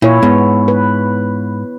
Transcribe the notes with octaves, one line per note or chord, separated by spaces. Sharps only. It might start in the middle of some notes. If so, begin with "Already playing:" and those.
A#2 E4 C#5
G#2 B3
B4